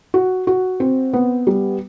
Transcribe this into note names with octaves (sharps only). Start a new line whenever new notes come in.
F#4
F#4
C4
B3
G3